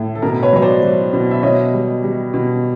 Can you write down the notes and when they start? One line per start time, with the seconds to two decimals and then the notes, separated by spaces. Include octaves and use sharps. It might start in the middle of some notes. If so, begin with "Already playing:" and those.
Already playing: A2
0.15 A4
0.22 B2 A#4
0.43 B4 C#5
0.53 F#3 C#5
0.62 C5 D5
0.82 F#3
1.13 B2
1.31 E5
1.43 B2 C#5 D#5
1.73 G3
2.04 G3
2.34 B2